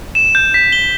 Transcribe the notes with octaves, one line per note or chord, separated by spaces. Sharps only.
E7
G6
B6
G7